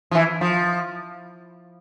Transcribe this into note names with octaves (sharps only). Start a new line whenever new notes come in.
F3
E3
F3